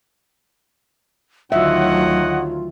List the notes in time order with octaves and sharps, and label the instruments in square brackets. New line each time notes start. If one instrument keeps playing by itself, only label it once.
[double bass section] D2 D#3 F#3 [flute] F4 [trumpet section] C#5 D#5 F#5 [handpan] E5